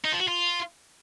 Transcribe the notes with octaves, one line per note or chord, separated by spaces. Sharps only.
D#4
F3
F#4
F4